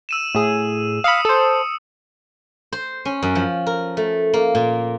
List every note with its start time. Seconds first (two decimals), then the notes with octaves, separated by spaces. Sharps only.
0.09 E6 D#7 E7
0.35 A2 G#4
1.04 F5 B5 D#6 E6 C#7
1.25 A4 C5
2.73 C5
3.05 C#4
3.23 F#2
3.35 F3
3.67 A#4
3.97 A3
4.34 A#3
4.55 A#2